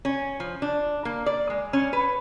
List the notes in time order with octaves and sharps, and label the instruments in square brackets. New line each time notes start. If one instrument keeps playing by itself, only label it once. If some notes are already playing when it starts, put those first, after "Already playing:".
[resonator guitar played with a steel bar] C#4
F3
D4
A#3
D5
G#3
C#4
B4